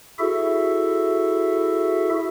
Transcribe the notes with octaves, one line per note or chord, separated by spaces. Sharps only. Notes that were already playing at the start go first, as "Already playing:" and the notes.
E4 F#4 G#4 A4 E5